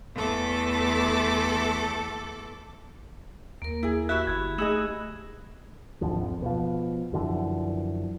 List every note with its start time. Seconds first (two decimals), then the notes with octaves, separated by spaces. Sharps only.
0.14 E2 A3 A4 D6
3.62 D#2 A#3 A#4
3.83 E4 G#4
4.09 E4 F#4 G4 E5 B5 F#6
4.27 G1 G#6
4.58 A3 D#4 G#4 D#5 E6 E7
6.01 G#1 D2 D3 F3
6.23 F2
6.42 B2 F3
7.13 F#2 D3 E3 F3